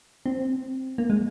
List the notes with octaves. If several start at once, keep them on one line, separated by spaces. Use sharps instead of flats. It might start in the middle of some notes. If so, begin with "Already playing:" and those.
C4
A#3
G#3